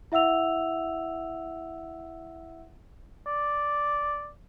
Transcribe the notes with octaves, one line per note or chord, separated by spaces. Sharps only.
E4 E5 F#5 E6 F7
D5